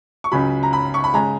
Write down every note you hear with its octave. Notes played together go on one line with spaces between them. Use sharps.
C#6
C#2 C#3 F#3 B5
A#5
B5
C#6
B5
C#3 G#3 A#5